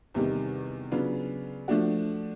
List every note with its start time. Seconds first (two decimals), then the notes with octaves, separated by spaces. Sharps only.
0.14 E2 C3 D#3 G3
0.91 C#3 F#3 B3 D4 F4
1.68 F3 A3 D4 F#4